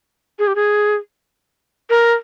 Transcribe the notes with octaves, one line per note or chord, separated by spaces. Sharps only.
G#4
G4
G#4
A#4